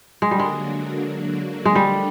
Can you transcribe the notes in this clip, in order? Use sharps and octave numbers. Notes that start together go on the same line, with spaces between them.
D3 F#3 G#3 A#3 D4 F#4
G3
G#3
G#3
D3 F3 G3 A3 D4 G4